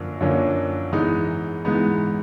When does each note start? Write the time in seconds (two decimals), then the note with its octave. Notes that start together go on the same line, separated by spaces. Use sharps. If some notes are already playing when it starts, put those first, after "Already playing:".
Already playing: F#2 D3 F3 A#3
0.21 F#2 D3 F3 A#3 C#4
0.92 G#2 E3 G#3 B3 D#4
1.65 G#2 E3 G#3 B3 D#4